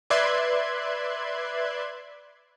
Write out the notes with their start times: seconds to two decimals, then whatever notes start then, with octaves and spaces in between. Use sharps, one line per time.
0.10 B4 D5 E5 C6 F#6 G#6